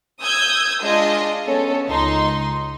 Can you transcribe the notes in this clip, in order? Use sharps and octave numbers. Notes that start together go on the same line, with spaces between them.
D#6 E6 G6 G#6
G#3 D4 F4 D#5
B3 C#4 A4
C#2 D#4 C6